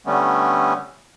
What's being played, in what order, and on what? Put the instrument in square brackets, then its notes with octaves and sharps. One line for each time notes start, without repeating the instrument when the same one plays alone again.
[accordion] D3 G3 A3 B3 C#4